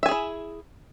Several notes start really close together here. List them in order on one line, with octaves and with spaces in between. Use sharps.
E5 G#5 G#4 E4